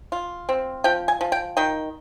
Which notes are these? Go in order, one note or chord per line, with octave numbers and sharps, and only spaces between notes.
F4
C4
F3 G5
G#5
F3
G5
D#3 G5